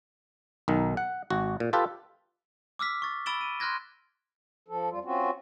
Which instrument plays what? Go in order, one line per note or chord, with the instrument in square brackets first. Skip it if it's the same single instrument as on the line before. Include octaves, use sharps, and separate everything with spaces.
[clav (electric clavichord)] B1 D#3
F#5
G#1 F#4
A#2
F4 G4 A4 B4
[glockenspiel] D6 E6 F6 B6
C#6 A6
B5 E6 A6 D7 E7 G7
D#7
C6 F6 F#6 G#6 A#6
[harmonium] F3 A4
F2 G3 F4
C4 C#4 F4 F#4